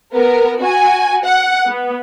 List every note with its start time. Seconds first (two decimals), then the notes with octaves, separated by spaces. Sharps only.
0.15 B3 A#4
0.61 F#4 G#5
1.25 F#5
1.67 B3